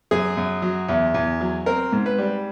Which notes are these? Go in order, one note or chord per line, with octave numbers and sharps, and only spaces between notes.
F#2 G#4
F#2
F#3
E2
E2
F#3
C4 A#4
G#2
B4
G3